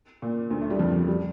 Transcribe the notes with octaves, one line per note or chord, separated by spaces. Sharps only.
A#2
D2 D3
A3
G3
F2 F3
G3